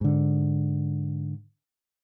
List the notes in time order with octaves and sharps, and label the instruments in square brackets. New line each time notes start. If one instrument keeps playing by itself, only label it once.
[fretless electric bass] G#2 D3